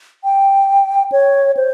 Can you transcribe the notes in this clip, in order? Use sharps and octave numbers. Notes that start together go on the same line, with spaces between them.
G5
C#5
C5